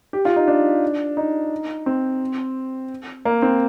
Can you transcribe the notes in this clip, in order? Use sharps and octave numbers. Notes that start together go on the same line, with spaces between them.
G4
F4
D#4
D4
D#4
C4
A#3
C4